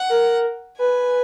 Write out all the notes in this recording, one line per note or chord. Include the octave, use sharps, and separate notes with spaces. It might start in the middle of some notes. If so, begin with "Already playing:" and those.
Already playing: F#5
A#4
B4 G#5